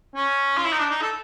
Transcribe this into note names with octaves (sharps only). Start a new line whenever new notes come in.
C#4
F4
E4
D#4
D4
D#4
A4